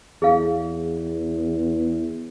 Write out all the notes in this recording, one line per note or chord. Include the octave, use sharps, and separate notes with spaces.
E2 G#4 F5